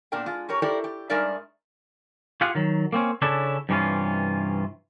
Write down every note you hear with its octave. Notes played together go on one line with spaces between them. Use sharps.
A#2 B3 D4 A#4 G5
G#3 F4
C#4 G4 A#4 C#5
E4 G4 A4 A#4 C5 D5
G4
G2 G#3 D#4 A#4 D5 E5
F4 G4 G#4 F5 F#5
D#3 F#3
A#3 C4 C#4
C#3 C#4 D4 E4 A4
G2 C3 E3 C#4 F4